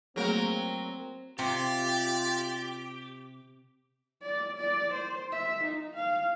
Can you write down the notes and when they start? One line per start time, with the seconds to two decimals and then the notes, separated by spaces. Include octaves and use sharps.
0.16 F#3 A3 A#3 C4 G#4 A#4
1.39 C3 F4 G4 D5
4.23 D5
4.56 D5
4.94 C5
5.32 E5
5.64 D#4
5.95 F5